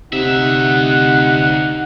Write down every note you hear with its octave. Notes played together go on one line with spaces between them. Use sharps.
D2 C3 D#4 E5 F#5